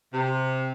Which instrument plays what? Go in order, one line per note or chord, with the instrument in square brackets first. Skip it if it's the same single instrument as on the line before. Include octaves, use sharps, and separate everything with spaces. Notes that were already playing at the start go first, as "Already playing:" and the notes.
[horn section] C3